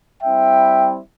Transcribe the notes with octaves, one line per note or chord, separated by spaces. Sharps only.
G3 C4 E4 E5 G5